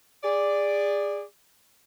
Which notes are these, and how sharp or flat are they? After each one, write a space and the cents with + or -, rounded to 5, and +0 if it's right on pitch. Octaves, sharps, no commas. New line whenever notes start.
G#4 -25 D5 +0